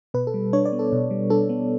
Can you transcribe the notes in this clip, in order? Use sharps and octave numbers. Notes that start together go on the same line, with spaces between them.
B2 B4
A4
G3
D4 C#5
D5
B3
A4
B2
G3
D4 A4
B3